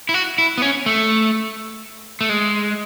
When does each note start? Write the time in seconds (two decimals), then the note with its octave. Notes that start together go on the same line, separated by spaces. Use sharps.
0.09 E4
0.14 F#4
0.38 E4
0.58 B3
0.62 C#4
0.86 A3
2.21 A3
2.29 G#3